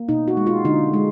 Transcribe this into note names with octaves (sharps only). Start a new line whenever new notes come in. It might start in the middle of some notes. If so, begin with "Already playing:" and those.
Already playing: A#3
B2 D#4
F#4
G#3
F4
D3 D#4
G#3